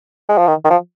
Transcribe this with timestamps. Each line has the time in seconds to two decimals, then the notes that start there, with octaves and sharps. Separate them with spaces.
0.29 G#3
0.38 F3
0.47 D#3
0.64 D#3
0.70 F3